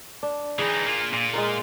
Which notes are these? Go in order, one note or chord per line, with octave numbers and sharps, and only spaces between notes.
D4
E3 D#4 G#4
A#3 F4
A#2
G#3 F4 A#4